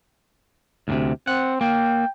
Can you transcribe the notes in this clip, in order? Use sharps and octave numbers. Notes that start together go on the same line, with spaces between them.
D2 A2 C3
C4 F#5
A#3 G5